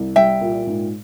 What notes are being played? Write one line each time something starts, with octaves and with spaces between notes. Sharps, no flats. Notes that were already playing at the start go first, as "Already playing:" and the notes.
Already playing: C2
G3 E5 G5
A#2
G#2